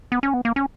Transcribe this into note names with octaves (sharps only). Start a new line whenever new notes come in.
B3
C#4
B3
A#3
C#4